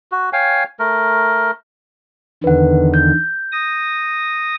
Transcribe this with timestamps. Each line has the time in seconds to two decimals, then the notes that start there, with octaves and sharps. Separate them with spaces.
0.12 F#4
0.33 C#5 F5 G5 G#5
0.79 A3 A#4
2.44 E2 D3 D#3 B4 F#5
2.94 G6
3.52 D#6 A#6